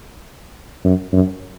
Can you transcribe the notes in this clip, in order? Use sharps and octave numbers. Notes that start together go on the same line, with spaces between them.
F#2
F#2